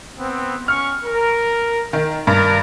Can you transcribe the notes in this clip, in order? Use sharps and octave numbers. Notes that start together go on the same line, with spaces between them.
B3 C4
C#4 C#6 F6
A#4
D#3
G2 A#4